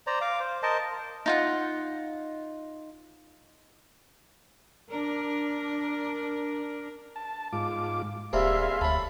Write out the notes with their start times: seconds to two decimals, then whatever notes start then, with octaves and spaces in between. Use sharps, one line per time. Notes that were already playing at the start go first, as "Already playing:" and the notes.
0.07 C5 D5 A#5
0.21 F5 D6
0.40 C5
0.63 A#4 C5 D#5 A5
1.26 D#4 F4 F#5
4.89 D4 A#4
7.16 A5
7.53 G#2 F4 D6
8.33 D#1 G3 A#3 C4 G#4 E5 F5 C6
8.81 D2 A4 C#5 B5